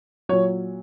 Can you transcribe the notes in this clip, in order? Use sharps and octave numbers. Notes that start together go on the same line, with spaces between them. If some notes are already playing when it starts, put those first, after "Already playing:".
A#2 F#3 C#5